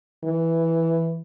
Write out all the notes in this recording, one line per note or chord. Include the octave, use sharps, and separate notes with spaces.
E3